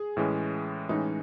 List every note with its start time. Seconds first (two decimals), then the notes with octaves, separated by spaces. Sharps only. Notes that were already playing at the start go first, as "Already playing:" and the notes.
Already playing: G#4
0.17 A2 E3 G#3 C#4
0.89 A2 E3 G#3 C#4 D#4